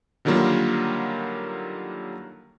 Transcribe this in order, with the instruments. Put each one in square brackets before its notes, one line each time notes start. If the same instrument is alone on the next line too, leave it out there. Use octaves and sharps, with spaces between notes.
[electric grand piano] D3 D#3 F#3 G3 A#3 F4